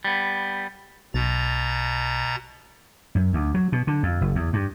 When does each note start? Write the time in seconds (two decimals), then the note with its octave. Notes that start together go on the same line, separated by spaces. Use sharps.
0.05 G3 B3
1.14 B1 B2 A#5 A6
3.15 F#2
3.33 D2
3.54 F#3
3.72 B2
3.87 D3
4.03 F2
4.21 F#1
4.35 E2
4.53 G2